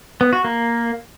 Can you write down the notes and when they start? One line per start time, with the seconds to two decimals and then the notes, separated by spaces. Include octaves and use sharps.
0.21 B3
0.33 F#4
0.44 A#3